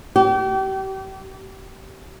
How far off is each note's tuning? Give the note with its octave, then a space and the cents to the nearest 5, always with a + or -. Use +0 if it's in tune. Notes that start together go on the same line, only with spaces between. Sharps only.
G4 -35